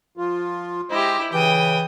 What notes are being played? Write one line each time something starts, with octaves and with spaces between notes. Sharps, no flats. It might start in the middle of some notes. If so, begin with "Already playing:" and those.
F3 F4
G#3 E4 G4 C5 D#5
C#3 E3 G5 D#6